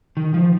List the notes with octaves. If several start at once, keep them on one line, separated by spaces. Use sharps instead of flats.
D#3
F3